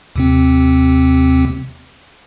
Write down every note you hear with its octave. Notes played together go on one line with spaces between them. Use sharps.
D#2 C3 C4